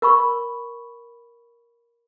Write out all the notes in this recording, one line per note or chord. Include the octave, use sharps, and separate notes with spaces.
A#4 B5 C#6